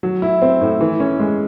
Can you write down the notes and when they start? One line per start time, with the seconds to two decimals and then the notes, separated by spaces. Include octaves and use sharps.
0.03 F#3
0.22 E4
0.42 C4
0.61 A2
0.81 E3
1.00 C#4
1.20 G#3